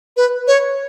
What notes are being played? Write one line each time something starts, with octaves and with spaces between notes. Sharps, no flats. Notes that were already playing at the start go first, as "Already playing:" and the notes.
B4
C#5